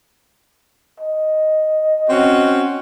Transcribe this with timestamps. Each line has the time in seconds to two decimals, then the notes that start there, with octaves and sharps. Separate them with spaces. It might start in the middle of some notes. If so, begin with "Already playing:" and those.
1.00 D#5
2.10 C4 C#4 F#4